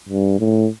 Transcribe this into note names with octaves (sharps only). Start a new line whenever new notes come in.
G2
A2